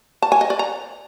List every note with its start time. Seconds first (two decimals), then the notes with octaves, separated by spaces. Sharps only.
0.22 A5
0.32 G#5
0.41 D#5
0.50 D5
0.59 A#5